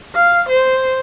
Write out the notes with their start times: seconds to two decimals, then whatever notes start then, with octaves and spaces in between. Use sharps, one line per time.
0.15 F5
0.49 C5